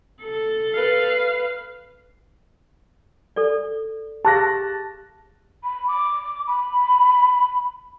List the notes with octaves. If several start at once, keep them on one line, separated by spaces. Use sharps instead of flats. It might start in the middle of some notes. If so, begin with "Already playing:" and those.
A4
B4 F5
A4 D5
G4 G#4 F5 A5 F#6 A#6
B5
D6
B5